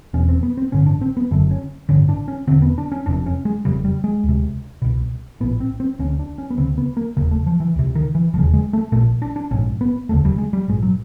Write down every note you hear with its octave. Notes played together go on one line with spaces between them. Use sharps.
E1 E2 B2 C#4
C4
B3
C4
A1 G2 D3 C#4
D4
C4
B3
F#1 F#2 D3
C#4
A1 G2 D3 C#4
D4
C#4
E1 D#2 D3 C4
B3
D4
C#4
F1 F2 C3 D4
C#4
G#3
F1 F2 C#3 G3
G3
G#3
D2 C3
C2 B2
A#1 A2 B3
C4
C4
D2 D3 C#4
D4
C#4
B3
D2 C#3 C4
B3
A#3
F1 D#2 C#3 A#3
A3
F3
E3
C#2 C3
D#3
E3
E1 D#2 C#3 F3
G#3
A3
A#1 A#2 A3
D4
D4
A#1 G#2 C#4
B3
E1 D2 C#3 A3
G3
G#3
G3
A#1 G#2 G#3
F#3